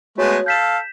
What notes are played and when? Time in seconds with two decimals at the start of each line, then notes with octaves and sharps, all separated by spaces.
0.18 G#3 A3 B3 F#4 C#5
0.46 A4 F5 G6 B6 E7